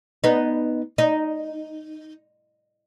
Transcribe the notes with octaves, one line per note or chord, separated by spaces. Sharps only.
B3 D#4
D#4